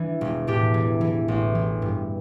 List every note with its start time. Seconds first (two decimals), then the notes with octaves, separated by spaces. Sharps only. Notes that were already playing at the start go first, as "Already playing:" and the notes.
Already playing: E3 D4
0.21 E1
0.47 A2 D4 G4
0.74 E3
1.01 E3
1.28 A1
1.55 E3
1.82 G2